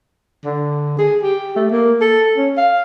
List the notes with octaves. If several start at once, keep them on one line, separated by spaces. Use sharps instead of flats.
D3
G#4
G4
A3
A#3
A4
C#4
F5